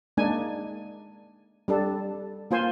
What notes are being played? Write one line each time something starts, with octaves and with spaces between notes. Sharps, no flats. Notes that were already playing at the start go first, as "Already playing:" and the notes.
G#3 A#3 D4 D#4 G#5
G3 D4 A4
A#3 F4 C5 G#5